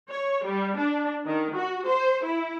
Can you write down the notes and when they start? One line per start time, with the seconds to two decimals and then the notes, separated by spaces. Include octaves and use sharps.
0.10 C#5
0.45 G3
0.77 D4
1.25 D#3
1.55 F#4
1.87 C5
2.24 E4